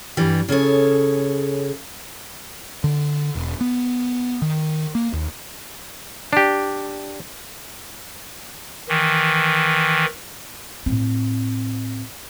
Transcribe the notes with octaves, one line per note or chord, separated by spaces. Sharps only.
G2 E3 G3
C#3 G#4 A4 C#5
D3
E1
B3
D#3
A#3
D#2
D4 G4
D#3 E3
A2 C4